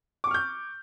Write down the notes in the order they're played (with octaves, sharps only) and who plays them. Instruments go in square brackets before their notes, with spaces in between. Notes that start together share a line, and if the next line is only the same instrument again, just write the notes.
[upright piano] D6
C#6
F6
G6